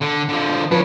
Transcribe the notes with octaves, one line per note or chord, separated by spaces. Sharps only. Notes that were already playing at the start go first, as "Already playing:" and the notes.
D3
D3 F3
F3 D4 B4 C#5